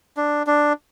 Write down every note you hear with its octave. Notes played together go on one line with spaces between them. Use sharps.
D4
D4